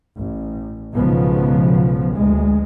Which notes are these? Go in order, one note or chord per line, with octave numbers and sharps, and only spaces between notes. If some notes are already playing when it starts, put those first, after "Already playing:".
A1
B1 G#2 C#3 F3 B3
D2 G#3